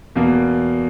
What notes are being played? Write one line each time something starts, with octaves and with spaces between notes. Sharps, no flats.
E2 B2 A#3